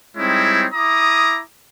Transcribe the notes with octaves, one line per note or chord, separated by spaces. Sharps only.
G3 G#3 C4 D#4 E4 C#5
E4 A#5 D6 D#6